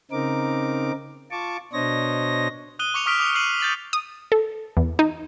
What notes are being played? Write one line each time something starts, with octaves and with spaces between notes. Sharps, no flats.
C#3 C4 D#4 A#4 D6
F4 A5 C#6 D6
B2 D4 C5 C#5 D#5 A#6
D#6 F#6 D#7 G7
C#6 D6 C#7 F7
C#6 D#6 F6 B6 D7
D6 D#6 F7
F6 C7 D#7 F#7 G7
G6 A6 F#7
D#6
A4
E2
D#4